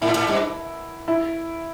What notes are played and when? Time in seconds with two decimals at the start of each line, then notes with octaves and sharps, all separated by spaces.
0.02 A2 E4
0.16 A2
0.28 G2
1.08 E4